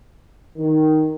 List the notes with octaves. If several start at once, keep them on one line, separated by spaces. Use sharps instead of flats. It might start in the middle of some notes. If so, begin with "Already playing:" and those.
D#3